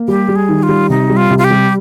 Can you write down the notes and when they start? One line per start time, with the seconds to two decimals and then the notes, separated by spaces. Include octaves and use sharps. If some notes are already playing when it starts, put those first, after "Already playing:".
Already playing: A#3
0.08 G3 G4
0.29 G3
0.35 G#4
0.49 D#3
0.63 F4
0.69 G3
0.90 C3 D#4
1.10 G3
1.17 F4
1.30 C3
1.38 F4
1.44 G4
1.50 G3